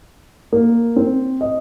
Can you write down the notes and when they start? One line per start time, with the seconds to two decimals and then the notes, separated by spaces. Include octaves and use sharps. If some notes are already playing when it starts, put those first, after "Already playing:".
0.52 A#3
0.96 C4
1.41 D#5